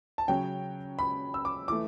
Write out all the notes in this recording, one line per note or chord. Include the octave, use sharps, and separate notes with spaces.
A5
C#3 F#3 C#4 G5
B5
E6
D6
E3 A3 D6